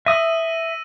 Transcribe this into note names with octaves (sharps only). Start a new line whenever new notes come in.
E5 D#6 E6 A#6 D#7